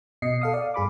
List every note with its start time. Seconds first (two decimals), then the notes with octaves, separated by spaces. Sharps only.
0.22 B2 D#5 C7 C#7
0.41 A4 F5 D#6
0.53 D5 F5
0.74 G2 G#4 B5 D6